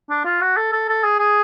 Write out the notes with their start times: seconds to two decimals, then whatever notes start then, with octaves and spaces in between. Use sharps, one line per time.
0.10 D4
0.25 F4
0.41 F#4
0.57 A4
0.72 A4
0.89 A4
1.04 G#4
1.19 G#4